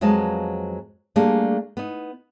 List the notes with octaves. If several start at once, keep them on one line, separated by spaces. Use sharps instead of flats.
F2 F#3 G#3 B3 F5 A5
G3 A3 A#3 D4 G4 G#4
B3 D#4